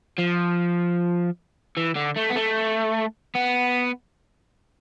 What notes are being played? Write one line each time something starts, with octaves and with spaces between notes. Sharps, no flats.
F3
E3
D3
A3
B3
A3
B3